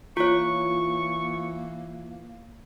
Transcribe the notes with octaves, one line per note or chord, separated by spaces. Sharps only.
E3 A#3 F4 C#5 C#6